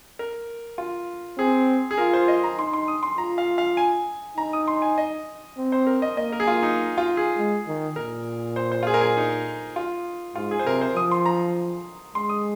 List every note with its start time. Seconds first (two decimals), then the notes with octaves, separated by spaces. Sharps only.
0.19 A#4
0.78 F4
1.38 C4 G#4
1.91 G#4
1.98 F4 A#4
2.13 C5
2.28 D#5
2.44 A#5
2.58 D#4 C6
2.73 C6
2.88 D#6
3.03 C6
3.18 F4 A#5
3.38 F5
3.58 F5
3.77 G#5
4.37 D#4 A#5
4.53 D#6
4.68 C6
4.82 G#5
4.98 D#5
5.58 C4
5.72 C5
5.87 A#4
6.02 D#5
6.17 A#3 D#5
6.32 A#4
6.40 G#4
6.47 F4
6.63 D#4
6.98 F4
7.17 G#4
7.37 G#3
7.67 D#3
7.96 A#2 A#4
8.56 C5
8.72 C5
8.83 F4
8.87 G#4
8.94 A#4
9.01 G#4
9.17 D#4
9.76 F4
10.35 G#2 F4
10.51 G#4
10.59 C5
10.66 C3 A#4
10.81 C5
10.96 F3 D#6
11.11 C6
11.26 A#5
12.15 G#3 C6
12.29 D#6